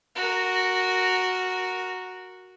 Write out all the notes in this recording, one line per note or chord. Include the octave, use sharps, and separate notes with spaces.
F#4 A#4